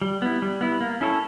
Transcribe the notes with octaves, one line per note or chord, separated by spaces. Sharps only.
G3
B3 E4
G3
B3 E4
A#3
C#4 E4 A4 C#5